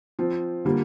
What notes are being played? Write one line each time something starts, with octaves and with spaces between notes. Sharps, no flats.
F3 C4 F4
D3 G3 A#3 F4